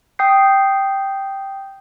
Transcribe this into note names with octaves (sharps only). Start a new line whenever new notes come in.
G5 D#6 G6 C7